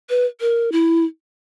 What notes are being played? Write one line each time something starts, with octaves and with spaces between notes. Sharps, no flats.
B4
A#4
E4